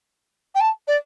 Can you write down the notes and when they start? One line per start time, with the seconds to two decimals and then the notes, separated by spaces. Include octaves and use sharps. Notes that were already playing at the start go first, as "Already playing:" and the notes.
0.55 G5
0.60 A5
0.88 D5